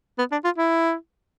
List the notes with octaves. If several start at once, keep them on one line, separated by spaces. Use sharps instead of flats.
B3
D4
F4
E4